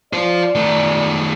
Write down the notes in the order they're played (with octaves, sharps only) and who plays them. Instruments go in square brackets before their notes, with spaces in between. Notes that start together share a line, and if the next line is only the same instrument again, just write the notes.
[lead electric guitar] F4 C5 [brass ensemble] D5
[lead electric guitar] D#3 A3